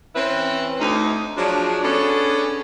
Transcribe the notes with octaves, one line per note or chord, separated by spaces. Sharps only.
E3 C4 C#4 E4 B4
D2 D#4
F3 F#3 G#3 D4
B3 C#4 D4 G#4 A4